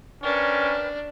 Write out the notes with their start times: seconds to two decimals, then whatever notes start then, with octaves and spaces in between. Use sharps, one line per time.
0.23 C#4 D4 A#4 B4 G5